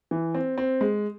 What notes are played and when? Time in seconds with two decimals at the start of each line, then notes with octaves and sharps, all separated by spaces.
0.11 E3
0.35 C4
0.58 C4
0.81 G#3